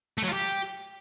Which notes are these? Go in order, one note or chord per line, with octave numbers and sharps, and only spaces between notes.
A3
F#3
F4
G4